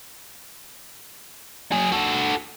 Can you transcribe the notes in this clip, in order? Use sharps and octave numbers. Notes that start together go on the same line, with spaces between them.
F#3 G#4
F#4 A4